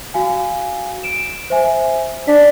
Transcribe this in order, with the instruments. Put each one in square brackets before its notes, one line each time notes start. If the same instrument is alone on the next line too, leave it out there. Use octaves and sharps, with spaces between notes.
[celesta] F#4 F5 G#5
D7 E7
C5 E5 G#5
[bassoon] D4 [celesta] B6